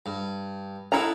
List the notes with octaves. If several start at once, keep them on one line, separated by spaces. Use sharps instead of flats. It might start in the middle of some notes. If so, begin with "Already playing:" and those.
G2
D#4 E4 A4 F#5 A#5